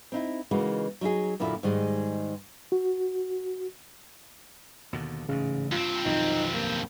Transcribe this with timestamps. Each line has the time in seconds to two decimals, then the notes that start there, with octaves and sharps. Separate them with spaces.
0.12 C4 D#4 E4
0.51 C#3 E3 G#3 A#3 D#4 F#4
1.01 F#3 D#4 E4 G#4
1.40 F#2 A#2 D3 E4
1.63 G#2 D#3 G3 G#3 G#4
2.72 F#4
4.93 D#2 B2 D3
5.29 A1 G#2 C#3
5.72 G2 C4 F4
6.05 B1 F2 D#3 D#4
6.54 A#3